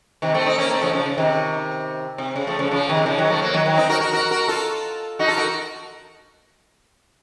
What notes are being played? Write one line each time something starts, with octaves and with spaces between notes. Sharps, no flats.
C3 D#3
A3 C4
C4 D#4
A#3 C#4
A3 C4
C#3 F3
D#3
C#3 F3
C#3
C3 D#3
C3
C#3
F3 A3
C#3 F3
C#3 F3
C3 D#3
C#3 F3
D#3 F#3
F3 A3
F#3 A#3
D#3 F#3
D#3 F#3
C4 D#4
F#4 A#4
F#4 A#4
F#4 A#4
F#4 A#4
F4 A4
D#4 F#4
F4 A4
F#4 A#4